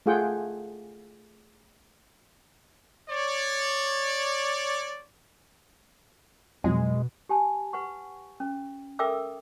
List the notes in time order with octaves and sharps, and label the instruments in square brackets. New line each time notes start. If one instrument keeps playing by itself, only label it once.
[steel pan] A3 F4 G#4 F#5 G5
[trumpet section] C#5 D5
[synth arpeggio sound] F2 [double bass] B2 [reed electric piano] F#3 [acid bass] G#3
[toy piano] G4 G#5 A5
B4 F#5 C#6
C#4
A4 A#4 E5 G5 D6 E6